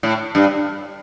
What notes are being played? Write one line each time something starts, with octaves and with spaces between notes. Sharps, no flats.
A2
G2